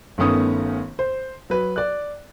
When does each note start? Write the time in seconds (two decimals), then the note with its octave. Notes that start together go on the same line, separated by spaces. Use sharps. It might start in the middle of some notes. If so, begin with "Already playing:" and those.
0.18 G1 D#3 A3 B3 C#4 D#6
0.99 C5
1.50 F#3 B4
1.76 D5 F#6